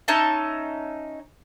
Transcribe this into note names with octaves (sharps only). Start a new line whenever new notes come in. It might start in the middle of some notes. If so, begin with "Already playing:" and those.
C#4 D#4 E5 A5